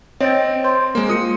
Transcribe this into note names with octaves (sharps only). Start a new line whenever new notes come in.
C4 C#5 D#5 G5 A6
C5 C6
G#3 A#3
F4 D#6 C#7